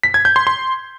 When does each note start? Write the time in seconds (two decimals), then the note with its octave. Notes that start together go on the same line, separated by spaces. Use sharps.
0.03 B6
0.14 G#6
0.25 G6
0.36 C6
0.47 C6